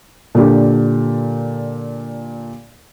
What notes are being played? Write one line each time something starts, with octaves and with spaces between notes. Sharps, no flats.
A#2 D3 D4 G4